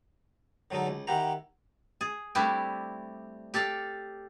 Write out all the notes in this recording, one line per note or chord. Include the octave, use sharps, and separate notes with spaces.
D3 F#3 G#3 D#4 A4
C#2
D#3 E4 G4 F#5 A#5
G#4
G3 A3 C4 D4 E4 G4
G4 A4 D5 F5